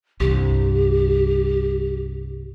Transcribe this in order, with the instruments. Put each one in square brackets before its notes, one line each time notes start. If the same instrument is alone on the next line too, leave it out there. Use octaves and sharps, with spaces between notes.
[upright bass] C2 G2 [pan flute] G4